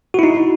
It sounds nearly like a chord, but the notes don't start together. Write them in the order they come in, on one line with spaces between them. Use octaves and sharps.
F#4 E4 D#4